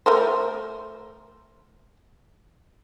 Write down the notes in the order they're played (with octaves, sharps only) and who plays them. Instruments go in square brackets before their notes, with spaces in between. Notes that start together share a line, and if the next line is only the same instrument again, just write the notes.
[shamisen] A3 A#4 C5